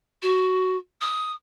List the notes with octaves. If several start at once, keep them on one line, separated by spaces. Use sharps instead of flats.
F#4
D#6